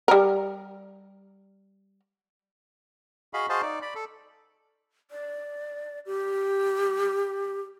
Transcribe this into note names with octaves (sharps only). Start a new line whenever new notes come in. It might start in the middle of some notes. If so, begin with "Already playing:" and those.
G3 A#4
F#4 G#4 D#5 F5 B5
F#4 G#4 C5 D#5 F5 A5
D#4 D5
D5 B5
A4
D5
G4